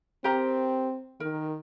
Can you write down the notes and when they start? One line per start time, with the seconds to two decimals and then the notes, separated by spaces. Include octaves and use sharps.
0.24 C4 G4 A#4 A#5
1.20 D#3 A#4